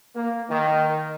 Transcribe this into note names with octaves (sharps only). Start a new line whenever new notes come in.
A#3
D#3